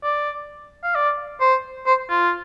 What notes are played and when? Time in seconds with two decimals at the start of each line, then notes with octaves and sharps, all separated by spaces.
0.03 D5
0.83 F5
0.95 D5
1.41 C5
1.87 C5
2.09 F4